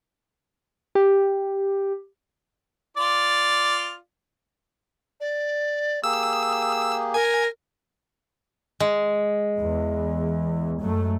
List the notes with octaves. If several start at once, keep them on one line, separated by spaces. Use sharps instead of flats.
G4
F4 D5
D5
A#3 G4 G#4 D#6 E6
A#4 G#5
G#3
E2
F#2 F#3 A3